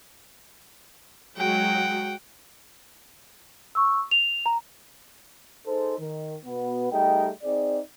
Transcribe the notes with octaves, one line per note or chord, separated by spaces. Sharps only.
F#3 G#3 F#5 G5
C#6 E6
F7
A#5
D#4 G#4 A4 C5
D#3
B2 B3
G3 A3 D#4 G#4 D#5 G5
C4 D#4 G#4 D5